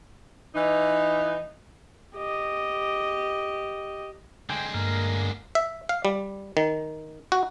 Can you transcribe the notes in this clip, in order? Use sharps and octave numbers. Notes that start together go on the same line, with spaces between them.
E3 D#4
G4 D#5
D3 G#3 C5 G5 G#5
G2 A#3 A#5 F6
E5
F5
G3
D#3
F#4